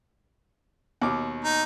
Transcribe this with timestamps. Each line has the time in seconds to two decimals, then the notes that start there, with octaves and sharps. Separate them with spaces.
1.02 D#2 B2 D6
1.44 D#4